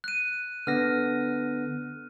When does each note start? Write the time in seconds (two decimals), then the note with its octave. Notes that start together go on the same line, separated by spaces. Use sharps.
0.04 F#6 D#7
0.67 D3 B3 F6 A#6